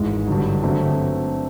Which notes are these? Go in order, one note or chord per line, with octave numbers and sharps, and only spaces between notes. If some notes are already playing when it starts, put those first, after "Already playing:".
Already playing: G#1 G#2 E3 G#3
G2 D3 F#3
D3 F#3 A3 C4